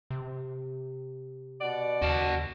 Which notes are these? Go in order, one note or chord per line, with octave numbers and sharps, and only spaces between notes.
C3
B2 D5 F#5
D#2 F#4 A5